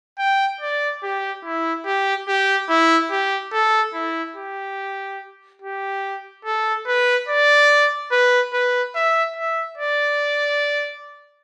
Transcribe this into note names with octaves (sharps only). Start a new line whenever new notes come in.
G5
D5
G4
E4
G4
G4
E4
G4
A4
E4
G4
G4
A4
B4
D5
B4
B4
E5
E5
D5